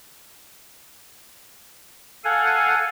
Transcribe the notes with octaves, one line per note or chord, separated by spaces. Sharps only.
A4 F5 F#5 G#5